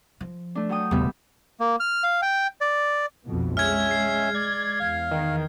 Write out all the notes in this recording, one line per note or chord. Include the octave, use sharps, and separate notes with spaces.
F3
A3 D4
F#3 G5 D#6
D#1 C#3 G3 B3 E5
A#3
F6
F5
G5
D5
B1 F2 B2
G#3 C#4 E5 F6 G#6
C7
D5 G#6
E2 F5
D#3